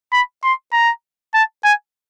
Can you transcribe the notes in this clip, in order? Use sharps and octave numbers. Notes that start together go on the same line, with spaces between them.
B5
C6
A#5
A5
G#5